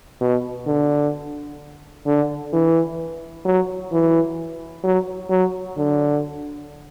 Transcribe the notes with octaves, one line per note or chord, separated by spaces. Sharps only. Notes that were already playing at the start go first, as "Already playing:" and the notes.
B2
D3
D3
E3
F#3
E3
F#3
F#3
D3